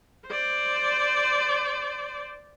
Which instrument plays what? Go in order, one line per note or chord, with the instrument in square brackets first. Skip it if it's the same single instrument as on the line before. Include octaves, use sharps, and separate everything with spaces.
[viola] C5 D5